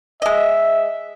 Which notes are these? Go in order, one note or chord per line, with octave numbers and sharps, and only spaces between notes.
G#3 D#5 E5